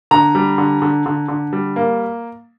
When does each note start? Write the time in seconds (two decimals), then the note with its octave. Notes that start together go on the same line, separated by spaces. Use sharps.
0.11 D3 A#5
0.35 G3
0.58 D3
0.82 D3
1.06 D3
1.28 D3
1.53 G3
1.76 A#3